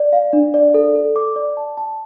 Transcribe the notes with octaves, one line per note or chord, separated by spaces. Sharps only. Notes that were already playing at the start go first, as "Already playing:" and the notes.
Already playing: D5
F5
D4
D5
A4
A4
D6
D5
A5
A5